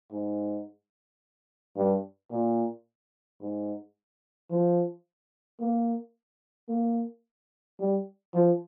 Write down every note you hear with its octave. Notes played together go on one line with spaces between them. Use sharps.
G#2
G2
A#2
G#2
F3
A#3
A#3
G3
F3